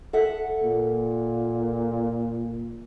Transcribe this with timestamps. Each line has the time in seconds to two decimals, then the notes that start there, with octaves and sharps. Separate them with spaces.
0.13 A4 E5 F#5
0.64 A#2